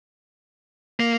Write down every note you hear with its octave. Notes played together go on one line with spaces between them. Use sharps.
A#3